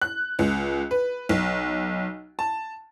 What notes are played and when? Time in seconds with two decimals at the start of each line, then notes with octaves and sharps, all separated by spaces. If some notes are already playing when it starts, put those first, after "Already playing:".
0.02 F#6
0.39 C#2
0.91 B4
1.29 B1
2.39 A5